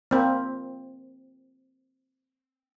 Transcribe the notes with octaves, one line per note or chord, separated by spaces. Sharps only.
A#3 C4